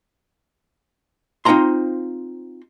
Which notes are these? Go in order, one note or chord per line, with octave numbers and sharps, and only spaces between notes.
C4 D#4 F4 C5 A#5 C6